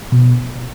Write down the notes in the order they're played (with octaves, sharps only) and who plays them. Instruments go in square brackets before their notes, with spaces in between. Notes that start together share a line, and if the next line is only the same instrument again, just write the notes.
[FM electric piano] B2